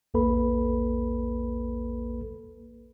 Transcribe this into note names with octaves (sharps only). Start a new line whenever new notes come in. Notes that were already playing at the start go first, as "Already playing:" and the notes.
A#1 E2 A#3 A4 B4 B5